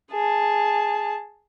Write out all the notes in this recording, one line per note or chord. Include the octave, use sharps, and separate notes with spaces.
G#4 A5